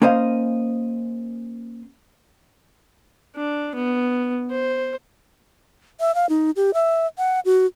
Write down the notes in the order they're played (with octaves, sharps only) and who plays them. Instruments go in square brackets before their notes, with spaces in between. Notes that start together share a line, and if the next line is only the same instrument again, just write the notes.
[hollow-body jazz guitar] A#3 C#4 C5 D#5 F5
[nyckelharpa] D4
B3
C5
[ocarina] E5
F5
D#4
G4
E5
F#5
F#4